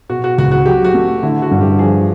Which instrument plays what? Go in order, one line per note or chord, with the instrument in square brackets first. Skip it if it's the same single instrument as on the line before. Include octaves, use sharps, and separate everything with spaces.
[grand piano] B2 [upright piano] F#4
[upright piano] F#4
[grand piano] C#2 [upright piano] F#4
[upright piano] F#4
[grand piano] F#3 [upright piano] G4
[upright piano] F#4
[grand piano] A3
[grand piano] D3 [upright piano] E4
[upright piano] F#4
[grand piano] G2
[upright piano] G4
[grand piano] F3 [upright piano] G#4